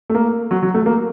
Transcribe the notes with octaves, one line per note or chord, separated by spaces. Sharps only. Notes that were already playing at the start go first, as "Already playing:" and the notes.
A3
A#3
F#3
F#3
A3
A#3